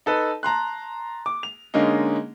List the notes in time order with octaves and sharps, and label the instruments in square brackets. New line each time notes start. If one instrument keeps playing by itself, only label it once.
[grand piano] D#4 A4 B4
A5 A#5 C6 F#6
D6
F7
D3 G#3 A#3 C#4 D#4